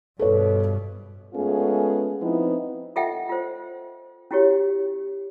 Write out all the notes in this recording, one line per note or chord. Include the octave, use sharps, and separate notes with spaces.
G2 B2 A4 B4 C#5
G#3 A3 B3 C#4 F4 G#4
F3 B3 C4 D#4 E4
F4 A4 D#5 E5 F#5 G5
F4 C5
C#4 E4 F#4 G4 C#5